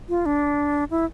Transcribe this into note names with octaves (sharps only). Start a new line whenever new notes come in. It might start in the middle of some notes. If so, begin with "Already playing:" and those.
F4
D4
E4